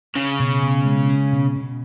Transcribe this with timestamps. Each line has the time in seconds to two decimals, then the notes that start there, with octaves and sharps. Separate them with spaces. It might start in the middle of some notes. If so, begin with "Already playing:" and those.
0.15 C#3 C#4
0.39 B2
0.62 B2
0.85 G#3
1.09 C#4
1.32 B2
1.55 B2